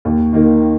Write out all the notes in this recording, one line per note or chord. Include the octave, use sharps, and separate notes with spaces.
D#2
D#3 A#3 D#4